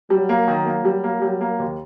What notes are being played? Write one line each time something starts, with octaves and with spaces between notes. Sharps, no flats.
F#3 G3
A#3
D#3
A#3
F#3 G3
A#3
F#3 G3
A#3
D#2